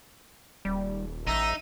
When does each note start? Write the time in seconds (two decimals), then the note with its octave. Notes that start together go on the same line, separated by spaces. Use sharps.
0.65 D#1 G3
1.27 A1 D#4 E5 A#5